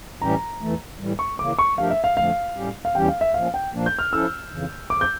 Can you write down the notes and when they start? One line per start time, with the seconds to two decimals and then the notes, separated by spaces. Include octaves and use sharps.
0.21 A2 E3 G3 C#4 G4 A#5
0.61 E2 E3 A3
0.99 A2 E3 G3
1.19 C#6
1.38 C#3 E3 A#3 D6
1.59 C#6
1.78 F3 A3 D4 G4 A#4 F5
1.90 E5
2.04 F5
2.17 F2 D3 F3 A3 F5
2.56 A2 G3 C#4 G4
2.85 F5
2.95 E2 E3 G3 C#4 G4 G5
3.08 F5
3.21 E5
3.34 A#2 F3 C#4 F5
3.54 G5
3.73 A#2 F3 A#3 D4
3.86 G6
3.99 F6
4.12 F3 C#4 E4 A4 E6
4.52 F2 C#3 E3
4.90 F2 C#3 F3 D6
5.01 G6